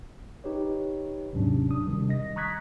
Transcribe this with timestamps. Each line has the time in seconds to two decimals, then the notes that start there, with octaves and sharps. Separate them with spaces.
0.44 D#4 G4 B4 C#5
1.33 D#2 G#2 C3 F#3 C#4 D4
1.69 D4 D#6
1.87 C3 D#3 G3
2.09 D#5 A#6
2.36 A#5 C#6 D#6 F#6 G#6 B6